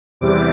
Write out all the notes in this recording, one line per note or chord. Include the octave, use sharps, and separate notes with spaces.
E2 C3 E3 G3 D6